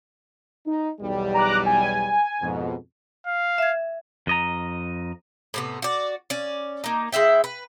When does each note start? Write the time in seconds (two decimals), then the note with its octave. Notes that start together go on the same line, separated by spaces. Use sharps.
0.67 D#4
1.00 B1 E2 G3
1.34 A#5 D6 F#6
1.66 G#5
2.41 F2 G#2 B2
3.27 F5
3.58 E5 G#6
4.27 F2 D#5 A#5
5.54 A2 C3 B3
5.82 F#4 D5
6.30 C#4 D5
6.84 A#3 D#4
7.12 G#3 E4 E5 G5
7.44 B4